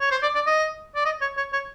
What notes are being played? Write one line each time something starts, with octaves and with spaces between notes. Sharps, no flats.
C#5
C5
D5
D5
D#5
D5
D#5
C#5
C#5
C#5